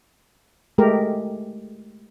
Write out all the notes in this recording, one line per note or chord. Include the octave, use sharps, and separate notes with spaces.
G#3 A3 G4 A#4